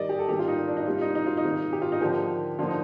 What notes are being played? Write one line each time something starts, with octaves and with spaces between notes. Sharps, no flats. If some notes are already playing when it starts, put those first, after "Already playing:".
Already playing: D#3 G3 A#3 D5 D#5
G4
A4
D#3 G3 A#3 G4
F4
D#4
D4
D#4
C3 G3 A#3 F4
D#4
D#4
F4
D#4
C3 D#3 A#3
G4
F4
D#4
D3 F3 A#3 G4
D3 F3 A#3 F4
D#4